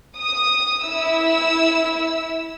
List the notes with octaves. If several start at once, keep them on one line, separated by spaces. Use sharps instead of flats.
D#6
E4 E6